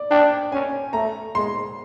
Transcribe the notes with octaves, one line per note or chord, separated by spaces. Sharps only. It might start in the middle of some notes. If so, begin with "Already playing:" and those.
Already playing: D5
D4 G5
C#4 G#5
A3 A#5
G#3 C6